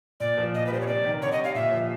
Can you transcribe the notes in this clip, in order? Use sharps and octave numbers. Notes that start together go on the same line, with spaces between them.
A#2 D5
F3
A#2 D#5
B4
G3 C5
C#5
C3 D5
D#3
D3 C#5
D#5
G3
F5
A#2 E5
F3